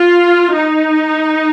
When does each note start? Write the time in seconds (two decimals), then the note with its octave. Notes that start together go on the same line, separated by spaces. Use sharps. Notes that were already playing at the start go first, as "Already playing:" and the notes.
Already playing: F4
0.54 D#4